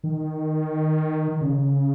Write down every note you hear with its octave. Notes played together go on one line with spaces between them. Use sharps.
D#3
C#3